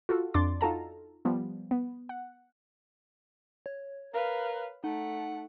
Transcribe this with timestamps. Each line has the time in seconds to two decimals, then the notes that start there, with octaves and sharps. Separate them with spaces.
0.09 F4 F#4 A4
0.34 F2 D4 D5 C6 D6 A6
0.61 D#4 F4 F#4 A4 A5 A#5
1.25 F3 G3 B3
1.71 B3
2.09 F#5
3.66 C#5
4.14 A#4 B4 F5
4.84 A3 D#4 F#5